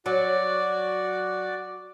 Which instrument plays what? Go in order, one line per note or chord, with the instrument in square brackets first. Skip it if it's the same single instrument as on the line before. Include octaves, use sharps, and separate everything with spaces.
[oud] F#3 [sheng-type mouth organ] F#4 D5